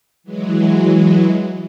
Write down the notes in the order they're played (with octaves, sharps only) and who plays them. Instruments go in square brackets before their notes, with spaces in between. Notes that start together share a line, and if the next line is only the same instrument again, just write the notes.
[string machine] E3 F#3 G#3